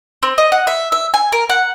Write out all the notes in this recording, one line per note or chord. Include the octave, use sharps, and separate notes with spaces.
C4
D#5
F#5
E5
E5
G#5
A#4
F#5